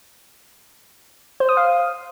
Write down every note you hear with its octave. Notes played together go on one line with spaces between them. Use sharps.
C5
D#6
F5